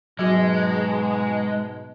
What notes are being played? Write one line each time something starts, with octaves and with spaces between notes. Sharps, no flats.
G#2 B2 F#3 G#3 F#4